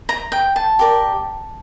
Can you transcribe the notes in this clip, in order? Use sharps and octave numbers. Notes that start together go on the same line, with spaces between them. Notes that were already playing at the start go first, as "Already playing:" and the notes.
A#5
G5
A5
G4 A#4 D5